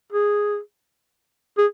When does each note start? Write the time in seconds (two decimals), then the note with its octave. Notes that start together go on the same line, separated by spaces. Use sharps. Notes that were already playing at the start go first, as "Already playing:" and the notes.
0.12 G#4
1.58 G#4